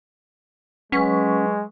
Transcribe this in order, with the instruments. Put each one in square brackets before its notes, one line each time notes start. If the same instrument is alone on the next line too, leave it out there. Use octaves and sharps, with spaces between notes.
[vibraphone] F#3 B4 C#6 [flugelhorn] G#3 [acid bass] C#4